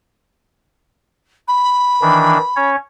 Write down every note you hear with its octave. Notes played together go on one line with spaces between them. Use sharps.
B5
D#3 E3 D4
C#4 C#5